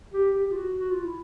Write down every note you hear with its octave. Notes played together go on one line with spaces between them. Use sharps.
G4
G4
F4
F#4
F#4
F4
E4